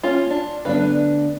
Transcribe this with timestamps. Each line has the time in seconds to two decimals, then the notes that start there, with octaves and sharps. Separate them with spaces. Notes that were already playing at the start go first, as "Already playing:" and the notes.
0.03 A#3 C#4 F4
0.30 D4
0.65 D2 B3 D4 B4 F5